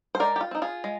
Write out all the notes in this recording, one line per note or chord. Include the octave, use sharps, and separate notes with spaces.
C5
G#3 A#4 D5
G4
F4
C4 D#4
F4 G#4
G#3